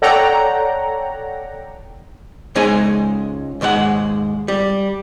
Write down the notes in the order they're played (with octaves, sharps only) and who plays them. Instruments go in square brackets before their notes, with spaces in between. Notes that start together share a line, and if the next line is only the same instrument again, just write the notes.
[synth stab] A4 C#5 D5 F#5 G5 A#5
[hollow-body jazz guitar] C#2 G#3 D#4 C5 G#5
D#2 G#2 G#3 F#5
G3